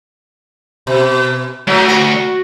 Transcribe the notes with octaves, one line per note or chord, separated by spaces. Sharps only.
B2
D2 G#2 F#3
F#4